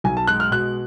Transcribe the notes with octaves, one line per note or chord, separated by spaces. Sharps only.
B1 G#5
A5
G#3 F#6
F6
B2 F#6